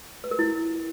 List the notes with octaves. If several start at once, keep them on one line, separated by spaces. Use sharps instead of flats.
B4
A#4
E4